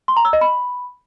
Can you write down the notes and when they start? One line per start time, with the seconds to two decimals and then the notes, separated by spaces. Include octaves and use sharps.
0.08 C6
0.16 A#5
0.25 E6
0.33 D#5
0.41 B5